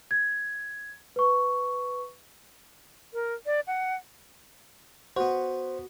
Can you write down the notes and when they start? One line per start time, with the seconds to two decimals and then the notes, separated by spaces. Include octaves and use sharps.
0.11 G#6
1.16 B4 C#6
3.14 A#4
3.46 D5
3.67 F#5
5.16 B3 F#4 C5